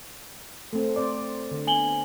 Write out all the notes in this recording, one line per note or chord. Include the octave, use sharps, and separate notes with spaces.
A3 C4
C4 C5 D5
D3
B3 G#5 F#7 G7